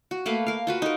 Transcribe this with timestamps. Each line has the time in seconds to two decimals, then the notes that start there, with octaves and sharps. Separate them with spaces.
0.11 F#4
0.26 A3 A#3 B4 F5
0.47 A#4 F5
0.67 F4 F#4 B4
0.82 D#4 A#4